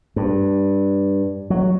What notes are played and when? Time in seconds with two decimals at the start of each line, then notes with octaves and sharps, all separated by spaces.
0.16 G2
1.50 F#3